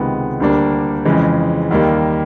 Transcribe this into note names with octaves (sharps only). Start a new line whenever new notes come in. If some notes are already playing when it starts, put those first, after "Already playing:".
Already playing: C#2 C3 D#3 G#3 B3
D2 D3 G3 A#3 D4
F2 C#3 E3 G#3
D#2 D#3 G3 A#3